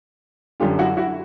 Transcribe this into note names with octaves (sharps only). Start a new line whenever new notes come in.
F#2 D3 G3 F4 G4
E4 F#4
E4 F#4